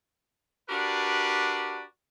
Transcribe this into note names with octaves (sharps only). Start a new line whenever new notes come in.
D4 F#4 G4 A#4 B4 D5